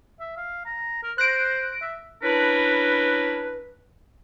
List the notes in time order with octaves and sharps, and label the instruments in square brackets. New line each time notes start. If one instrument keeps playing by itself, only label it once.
[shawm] E5
F5
A#5
A#4
[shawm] C5 [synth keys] F#6 A#6 D7
[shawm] E5
[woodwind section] C#4 D4 E4 A#4 B4